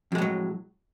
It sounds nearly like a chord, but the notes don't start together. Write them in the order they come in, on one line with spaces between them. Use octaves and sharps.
F2 G#3 A2 F#3